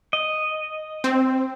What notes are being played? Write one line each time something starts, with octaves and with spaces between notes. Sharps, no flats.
D#5
C4